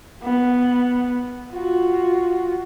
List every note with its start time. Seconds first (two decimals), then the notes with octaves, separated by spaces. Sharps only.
0.23 B3
1.53 F4 F#4